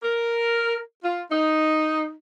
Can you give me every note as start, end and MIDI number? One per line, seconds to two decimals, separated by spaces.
0.03 0.77 70
1.04 1.24 65
1.30 2.11 63